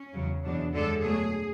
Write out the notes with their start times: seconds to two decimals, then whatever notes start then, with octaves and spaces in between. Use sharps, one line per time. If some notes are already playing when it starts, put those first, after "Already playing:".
Already playing: C#4
0.14 E2 C#3 F#3
0.44 E2 B2 F#3 D4
0.74 F#2 D3 G#3 A4
1.03 B2 F#3 A3 G#4